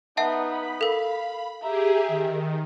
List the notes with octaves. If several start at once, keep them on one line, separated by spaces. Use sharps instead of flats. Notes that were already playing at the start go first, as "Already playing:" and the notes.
B3 D#4 E5 F#5 A5
B5
A4 A#4 F5
G4 G#4 E5 A#5
D#3